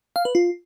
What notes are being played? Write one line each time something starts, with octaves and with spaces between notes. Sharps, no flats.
F5
B4
F4